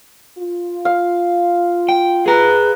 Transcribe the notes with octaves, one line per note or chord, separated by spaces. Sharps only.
F4
F5
G5
G#4 B4 A#5